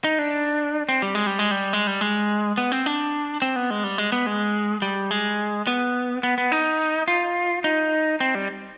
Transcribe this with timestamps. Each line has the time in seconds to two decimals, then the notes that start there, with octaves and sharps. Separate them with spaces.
0.04 D#4
0.19 D4
0.89 C4
1.02 G3
1.15 G#3
1.27 G3
1.39 G#3
1.51 G3
1.73 G#3
1.87 G3
2.01 G#3
2.58 B3
2.72 C4
2.86 D4
3.42 C4
3.56 B3
3.70 G#3
3.84 G3
3.98 G#3
4.12 B3
4.26 G#3
4.82 G3
5.11 G#3
5.67 B3
6.23 B3
6.38 B3
6.52 D#4
7.08 F4
7.64 D#4
8.20 C4
8.35 G3